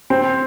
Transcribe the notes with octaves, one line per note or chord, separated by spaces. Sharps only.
C4